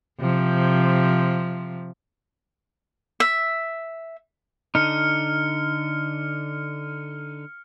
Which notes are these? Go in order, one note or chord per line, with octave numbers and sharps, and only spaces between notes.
C3 F3
E5
D3 D#4 F6 C#7